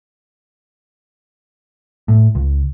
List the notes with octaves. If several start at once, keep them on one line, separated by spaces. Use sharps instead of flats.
A2
C#2